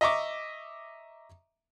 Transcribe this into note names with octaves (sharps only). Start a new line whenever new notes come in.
D#5 E5 A#5 C#6 D6